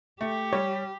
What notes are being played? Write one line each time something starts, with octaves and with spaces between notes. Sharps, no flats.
A3 G4
G3 C#5